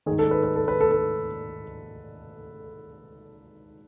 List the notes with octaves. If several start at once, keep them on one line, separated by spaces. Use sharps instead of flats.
G#2 D#3 G#4
A4
B4
B4
A4
B4
A4
A4